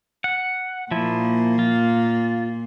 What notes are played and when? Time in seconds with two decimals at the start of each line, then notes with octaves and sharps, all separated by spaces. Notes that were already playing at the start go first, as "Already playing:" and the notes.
0.24 F#5
0.91 A#2 F3 A#3 E4
1.59 F4